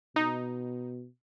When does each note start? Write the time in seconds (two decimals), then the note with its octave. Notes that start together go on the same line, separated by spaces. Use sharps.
0.16 B2 D#4